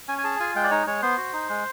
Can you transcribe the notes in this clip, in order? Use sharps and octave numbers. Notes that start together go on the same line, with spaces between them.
C#4 G#5
G#5
G#4 A5
F4 G#5
G#3 G5
D5
D#4 C#5
G#3 C#5
B3 C5
F#4
D#4
G#3